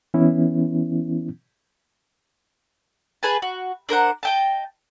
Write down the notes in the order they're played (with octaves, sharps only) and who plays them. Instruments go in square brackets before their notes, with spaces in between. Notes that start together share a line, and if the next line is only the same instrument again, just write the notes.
[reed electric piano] E3 B3 C#4 E4
[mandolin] G#4 B4 G#5 A5
F#4
D4 A#4 C5 F#5
D#5 G5 A5